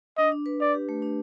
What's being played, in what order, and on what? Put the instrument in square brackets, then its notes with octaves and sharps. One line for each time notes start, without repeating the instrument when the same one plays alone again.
[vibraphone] D4 [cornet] D#5
[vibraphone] D4
B4
[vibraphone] D4 [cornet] D5
[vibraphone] G4
A3
D4